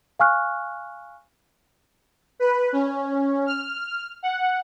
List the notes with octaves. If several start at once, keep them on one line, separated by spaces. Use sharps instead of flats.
F5 G#5 C#6 F6 F#6
B4
C#4
F6
F#5